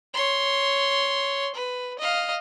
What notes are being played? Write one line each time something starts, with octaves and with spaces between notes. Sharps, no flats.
C#5 C6
B4
D#5 F5